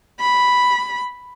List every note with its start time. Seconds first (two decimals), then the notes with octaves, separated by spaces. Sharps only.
0.21 B5